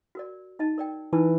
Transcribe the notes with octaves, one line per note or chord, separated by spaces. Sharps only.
F#4 A#4 D5
D#4 D#5 A5
A#4 D5 G5
E3 D#4 B4 A5